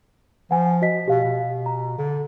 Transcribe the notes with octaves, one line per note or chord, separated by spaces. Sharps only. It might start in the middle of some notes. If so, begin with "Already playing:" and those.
F3 F#5 G#5
F#4 D#5 B6
B2 G4 F5
B2
A#5
D3